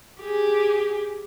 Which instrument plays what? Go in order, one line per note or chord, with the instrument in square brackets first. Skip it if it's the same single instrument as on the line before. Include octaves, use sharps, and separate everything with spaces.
[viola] G4 G#4